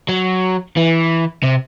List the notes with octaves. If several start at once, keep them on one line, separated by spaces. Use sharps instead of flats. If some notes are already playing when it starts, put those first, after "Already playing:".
F#3
E3
C3